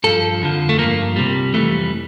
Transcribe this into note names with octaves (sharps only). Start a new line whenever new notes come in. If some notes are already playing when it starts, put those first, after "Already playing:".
G2 F3 A4
F2 D3 F3
A3
G2 F3 A#3
C2 C3 G3
F2 E3 G3 A3